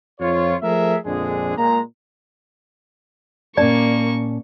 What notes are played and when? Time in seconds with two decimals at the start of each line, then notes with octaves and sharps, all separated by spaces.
0.20 F2 F4 C#5
0.62 F3 A3 G#4 A#4 E5
1.06 A#1 F2 D3 G#3 D4 G#4
1.58 A#2 G#3 A#5
3.57 A#2 A#3 C#4 D5 A5 C#6